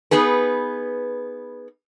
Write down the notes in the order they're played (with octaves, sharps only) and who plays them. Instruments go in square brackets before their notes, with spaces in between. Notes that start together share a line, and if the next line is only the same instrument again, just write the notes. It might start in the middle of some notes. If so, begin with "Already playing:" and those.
[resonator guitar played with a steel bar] B3 D#4 G#4 B4